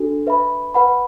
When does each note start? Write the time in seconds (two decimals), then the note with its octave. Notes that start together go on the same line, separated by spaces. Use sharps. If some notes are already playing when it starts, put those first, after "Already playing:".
Already playing: D4 F#4 A4
0.27 B4 E5 B5
0.74 B4 F#5 B5